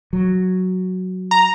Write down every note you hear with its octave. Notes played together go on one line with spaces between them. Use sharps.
F#3
A#5